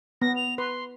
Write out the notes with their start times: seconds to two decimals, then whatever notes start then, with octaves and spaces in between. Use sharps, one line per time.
0.22 B3 A#6
0.36 F7
0.58 B4 C6